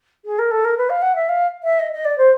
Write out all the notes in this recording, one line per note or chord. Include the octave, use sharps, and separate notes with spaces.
G#4
A#4
A4
A#4
B4
F5
F#5
E5
F5
E5
D#5
D#5
D5
C5